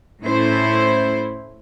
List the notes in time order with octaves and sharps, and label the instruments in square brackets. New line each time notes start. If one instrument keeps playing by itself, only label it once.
[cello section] A2 A3 C#4 E4 C5